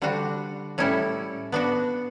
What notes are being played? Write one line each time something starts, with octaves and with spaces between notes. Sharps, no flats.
D3 G3 D4 F#4
A2 G3 C#4 E4 A4
B3 D4 F#4